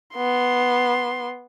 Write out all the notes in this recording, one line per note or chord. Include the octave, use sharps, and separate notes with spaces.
B3 C6